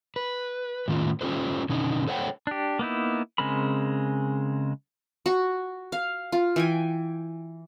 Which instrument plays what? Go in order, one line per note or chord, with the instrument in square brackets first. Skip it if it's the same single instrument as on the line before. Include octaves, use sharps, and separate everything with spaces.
[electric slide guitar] B4
A2 D#3 C#4 F4
C#4 F4 G4 A4 C5
B2 D3 C#4 D#4
A4 C5 C#5 F#5 G5
[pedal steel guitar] D4 G4
A#3 B3 D#4 E4
C#3 G#3 C4 A#4 B5
[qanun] F#4
F5
F4
E3 G5 G#5